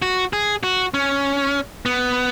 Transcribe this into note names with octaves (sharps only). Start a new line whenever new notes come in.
F#4
G#4
F#4
C#4
B3